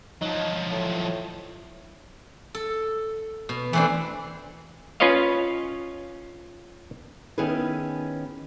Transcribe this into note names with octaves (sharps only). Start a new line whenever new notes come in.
F3 F#3 D#4
A2
A4
B2
E3 A3 C4 D4
C#4 F4 B4 C#5 D#5 F5
D#3 B3 C#4 E4 G#4 B4